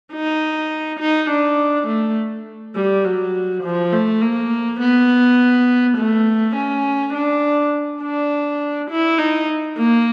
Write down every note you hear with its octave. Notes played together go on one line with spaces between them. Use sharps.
D#4
D#4
D4
A3
G3
F#3
F3
A3
A#3
B3
A3
C#4
D4
D4
E4
D#4
A#3